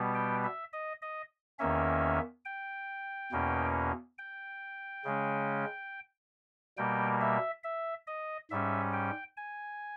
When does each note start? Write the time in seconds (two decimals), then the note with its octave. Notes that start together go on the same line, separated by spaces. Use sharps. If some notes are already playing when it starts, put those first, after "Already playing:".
Already playing: B2 G3 B3
0.15 G5
0.44 E5
0.73 D#5
1.02 D#5
1.59 E2 D#3 A#3 C#4 E5
2.45 G5
3.32 E2 B2 A#3 C#4
4.18 G5
5.05 C#3 G#3 C#4
6.77 B2 G3 A#3 G5
7.21 E5
7.64 E5
8.07 D#5
8.51 G#2 G3 C#4 E5
8.93 G5
9.37 G#5